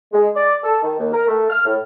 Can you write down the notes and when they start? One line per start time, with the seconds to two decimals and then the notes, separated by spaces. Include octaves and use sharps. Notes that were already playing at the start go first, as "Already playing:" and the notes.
0.12 G#3
0.35 D5
0.64 A4
0.83 D#3
0.99 D#2
1.13 A#4
1.28 A3
1.50 F6
1.65 A2